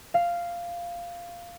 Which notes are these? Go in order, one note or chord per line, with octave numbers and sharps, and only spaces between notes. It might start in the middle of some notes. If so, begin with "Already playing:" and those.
F5